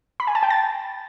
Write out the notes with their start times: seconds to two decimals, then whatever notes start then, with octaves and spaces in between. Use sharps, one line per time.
0.20 B5
0.27 G#5
0.35 A5
0.43 G5
0.50 A6